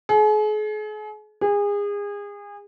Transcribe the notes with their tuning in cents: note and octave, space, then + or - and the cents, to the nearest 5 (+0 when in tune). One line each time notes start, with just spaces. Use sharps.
G#4 +40
G#4 -30